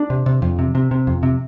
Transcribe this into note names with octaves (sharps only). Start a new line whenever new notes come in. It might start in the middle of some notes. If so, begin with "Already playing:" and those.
Already playing: D4
C3
C3
F2
C3
C3
C3
F2
C3